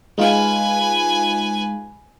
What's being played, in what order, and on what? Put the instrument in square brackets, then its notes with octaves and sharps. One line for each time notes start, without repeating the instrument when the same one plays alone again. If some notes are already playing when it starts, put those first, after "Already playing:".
[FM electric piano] G#3 D#4 F4 [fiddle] B4 G#5